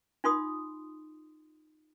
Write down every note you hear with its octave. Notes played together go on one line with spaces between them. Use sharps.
D#4 F4 C6 D#6